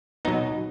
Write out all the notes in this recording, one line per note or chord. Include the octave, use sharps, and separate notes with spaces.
B2 F#3 B3 D#4